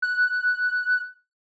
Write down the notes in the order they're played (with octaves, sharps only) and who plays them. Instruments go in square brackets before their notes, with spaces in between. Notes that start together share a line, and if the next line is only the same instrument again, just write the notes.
[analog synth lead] F#6